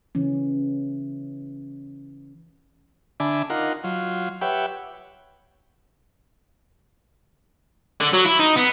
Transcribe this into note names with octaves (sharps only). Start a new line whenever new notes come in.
C#3 E3 C#4
D3 D4 E5 G#5 B5 D6
D#4 F4 A#4 F#5
F#3 F4
G4 B4 C#5 E5 F#5 G5
D3
F#3
E4
D#4
B3